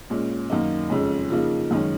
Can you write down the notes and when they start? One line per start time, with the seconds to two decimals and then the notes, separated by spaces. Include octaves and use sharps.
0.10 A#2 G#3 C#4
0.50 F#2 D#3 A#3 D#4
0.90 F2 C#3 G#3 C#4
1.30 C#3 F3 A#3 D#4
1.71 F#2 D#3 G#3 C#4